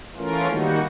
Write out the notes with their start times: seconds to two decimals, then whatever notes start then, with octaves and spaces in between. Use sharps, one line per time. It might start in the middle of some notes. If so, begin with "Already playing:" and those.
0.15 E3 A3 C#4 F4 A#4
0.47 D#3 G3 A#3 D#4 F#4